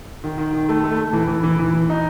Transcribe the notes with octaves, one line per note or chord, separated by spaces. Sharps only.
D#3
D#3
D#3
A3
A3
A3
E3
E3
E3
E3
E3
D#4